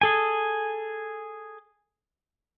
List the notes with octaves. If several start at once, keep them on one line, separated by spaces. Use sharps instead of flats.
G#4 A4 G#5